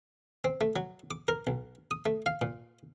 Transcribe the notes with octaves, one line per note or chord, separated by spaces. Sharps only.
C4
A3
F#3
D6
A#4
B1
D#6
A3
F5
A#2